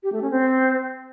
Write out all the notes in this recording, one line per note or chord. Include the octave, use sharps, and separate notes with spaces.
G4
A3
C#4
C4